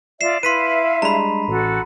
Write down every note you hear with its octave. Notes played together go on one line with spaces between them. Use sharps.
F4 D5 E5 C7 E7
E4 B4 E5 F5 C6 B6 D#7
G3 G#3 D4 A#5 B5
A1 F#4 A4